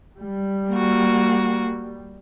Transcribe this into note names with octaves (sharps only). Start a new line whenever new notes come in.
G3
A#3 F#4